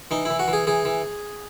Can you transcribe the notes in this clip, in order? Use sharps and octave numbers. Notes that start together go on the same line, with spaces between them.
E3 D#4
E3 E4
F#4
E3
G#4
E3 G#4
E3